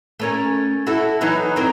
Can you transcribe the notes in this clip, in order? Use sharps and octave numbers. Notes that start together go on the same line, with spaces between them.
A3 C#4 A#4
E4 F#4 A4
E3 F#3 D#4
F#3 C4 A#4